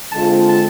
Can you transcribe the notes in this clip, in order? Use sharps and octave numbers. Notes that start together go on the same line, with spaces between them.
D3 G#3 C4 F4 A5
A5